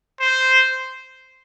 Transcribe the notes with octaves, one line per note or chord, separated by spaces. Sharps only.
C5